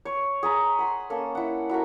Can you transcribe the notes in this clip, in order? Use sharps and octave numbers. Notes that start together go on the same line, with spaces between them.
C#5 C#6
G#4 B4 A#5 B5
F#5 B5 C6
A#3 C#4 A4
E4 F#5
E4 F#4 A4 A#4